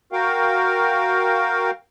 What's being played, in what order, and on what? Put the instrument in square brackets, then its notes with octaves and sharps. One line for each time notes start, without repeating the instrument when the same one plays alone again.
[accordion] F#4 A#4 F5 G5